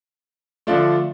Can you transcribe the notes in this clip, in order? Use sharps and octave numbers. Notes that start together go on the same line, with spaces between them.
D3 F3 A3 D4 F4